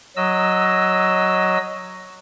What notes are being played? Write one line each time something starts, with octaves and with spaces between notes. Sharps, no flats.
F#3 D#5 E6